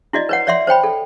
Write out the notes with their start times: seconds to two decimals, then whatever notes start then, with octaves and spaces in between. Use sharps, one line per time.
0.13 E4 F#4 D5 D#5
0.29 B4 C#5 F#5
0.47 C#5 D5 E5 F#5 C6
0.67 C5 C#5 G5 B5
0.84 A4